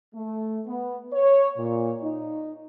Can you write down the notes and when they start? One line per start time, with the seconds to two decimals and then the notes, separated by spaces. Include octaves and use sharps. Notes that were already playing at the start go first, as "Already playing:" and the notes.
0.14 A3
0.67 B3
1.13 C#5
1.58 A#2
2.00 D#4